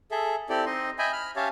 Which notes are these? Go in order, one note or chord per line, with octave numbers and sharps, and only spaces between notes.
G#4 A4 E5
C4 E4 G4 A4 D5
C4 D#4 D#5 C6
D#5 E5 G5 G#5 B5
B5 F6
C#4 G4 C#5 E5 F5 A5